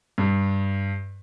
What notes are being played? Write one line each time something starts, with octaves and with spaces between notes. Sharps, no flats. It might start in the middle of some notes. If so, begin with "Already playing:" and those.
G2